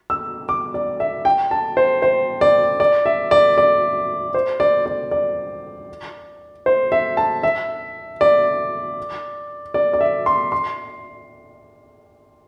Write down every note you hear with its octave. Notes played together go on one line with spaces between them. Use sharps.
E6
D6
D5
E5
G5
A5
C5
C5
D5
D5
E5
D5
D5
C5
D5
D5
D5
C5
E5
A5
E5
D5
D5
D5
E5
C6
C6